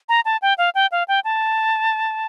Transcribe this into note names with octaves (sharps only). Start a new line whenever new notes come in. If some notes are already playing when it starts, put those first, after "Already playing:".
A#5
A5
G5
F5
G5
F5
G5
A5